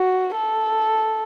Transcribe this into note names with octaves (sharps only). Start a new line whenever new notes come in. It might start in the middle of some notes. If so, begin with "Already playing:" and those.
Already playing: F#4
A4